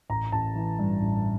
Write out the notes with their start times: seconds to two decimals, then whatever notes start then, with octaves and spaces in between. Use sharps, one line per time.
0.09 A1 A#5
0.32 A1 A5
0.56 E3
0.79 G2
1.01 A1